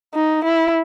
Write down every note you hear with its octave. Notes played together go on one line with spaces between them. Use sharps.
D#4
E4